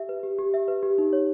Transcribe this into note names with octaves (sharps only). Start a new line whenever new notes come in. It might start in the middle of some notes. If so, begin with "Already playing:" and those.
Already playing: G4 E5
B4
G4
G4
E5
B4
G4
D#4
C#5